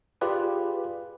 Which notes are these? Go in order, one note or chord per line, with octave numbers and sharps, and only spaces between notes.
F4 G4 G#4 B4 D5